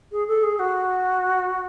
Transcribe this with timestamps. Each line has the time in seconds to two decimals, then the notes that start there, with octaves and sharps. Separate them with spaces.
0.12 G#4
0.27 A4
0.43 G#4
0.59 F#4